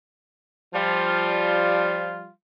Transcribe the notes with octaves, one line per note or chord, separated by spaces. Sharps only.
F3 G3 F4